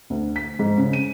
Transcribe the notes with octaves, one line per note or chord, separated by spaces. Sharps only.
D2
B6
G#2
C#3
D#7